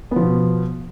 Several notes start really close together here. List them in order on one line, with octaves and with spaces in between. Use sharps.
B3 F3 B2